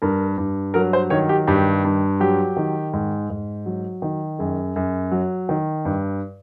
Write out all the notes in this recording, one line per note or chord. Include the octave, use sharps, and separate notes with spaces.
G2 A#4
G2
F#3 A#4
C5
D#3 C#5
G4
G2 G4
G2
F#3 G4
D#3
G#2
G#2
F#3
D#3
F#2 G#4
F#2
F#3
D#3
G2